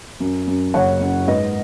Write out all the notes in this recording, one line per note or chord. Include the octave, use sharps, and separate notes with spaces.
F#2
F#2
F#1 C#5 F#5
F#2
G#2 B4 D#5